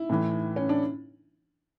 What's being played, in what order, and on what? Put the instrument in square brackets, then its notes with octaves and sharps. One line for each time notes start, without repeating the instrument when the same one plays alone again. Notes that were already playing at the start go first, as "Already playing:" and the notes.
Already playing: [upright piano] E4
A2 E3
C#4
D4